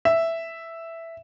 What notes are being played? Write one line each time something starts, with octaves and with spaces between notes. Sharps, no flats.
E5